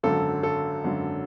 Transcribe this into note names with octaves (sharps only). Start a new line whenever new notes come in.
G#1 F#2 D3 A4
A4
G#1 F#2 D3